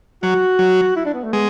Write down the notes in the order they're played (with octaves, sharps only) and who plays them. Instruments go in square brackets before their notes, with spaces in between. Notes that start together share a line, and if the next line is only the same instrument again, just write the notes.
[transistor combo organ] F#3 [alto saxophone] F#4
[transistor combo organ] F#3
[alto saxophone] E4
D4
B3
A3
[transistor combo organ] G#3 [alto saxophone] B3